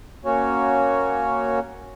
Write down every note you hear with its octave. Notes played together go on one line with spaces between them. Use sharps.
A#3 C#4 F#4 C#5